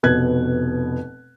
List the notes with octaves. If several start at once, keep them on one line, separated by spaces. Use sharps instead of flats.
F1 B2 F#6 G#6